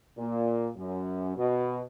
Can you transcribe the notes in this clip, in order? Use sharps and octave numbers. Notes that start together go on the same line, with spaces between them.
A#2
F#2
B2